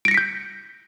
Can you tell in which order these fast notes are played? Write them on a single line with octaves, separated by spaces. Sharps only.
D7 A#6 C#7 B6 G6